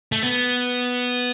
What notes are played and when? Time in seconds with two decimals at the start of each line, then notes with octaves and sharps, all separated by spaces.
0.12 A3
0.23 B3